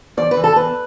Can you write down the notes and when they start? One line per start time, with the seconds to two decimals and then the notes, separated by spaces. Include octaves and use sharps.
0.17 E2 D5
0.31 B4
0.37 E3
0.44 A4
0.56 E2 B4